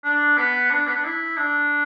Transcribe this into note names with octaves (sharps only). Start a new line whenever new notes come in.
D4
B3
D4
B3
D4
E4
D4